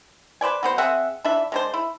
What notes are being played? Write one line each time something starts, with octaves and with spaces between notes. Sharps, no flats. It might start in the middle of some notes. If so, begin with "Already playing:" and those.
B4 C5 D5 G#5
F#3 B3 C5
C4 G#4 E5 F#5
E3 D4 E5
G#3 D4 C5
E4